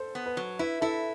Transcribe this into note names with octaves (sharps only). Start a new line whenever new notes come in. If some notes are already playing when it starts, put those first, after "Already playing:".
Already playing: A4 C5
B3
B4
F#3
E4 B4
E4 A4